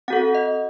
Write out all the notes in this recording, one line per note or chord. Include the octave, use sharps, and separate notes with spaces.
C4 F#4 A4 F#5
D#5